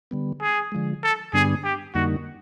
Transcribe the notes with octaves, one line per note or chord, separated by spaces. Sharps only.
D3 G3 B3
G#4
D3 F3 G#3
A4
G2 D3 G3 B3 D4 G#4
G4
F2 D3 G3 A#3 D#4 F#4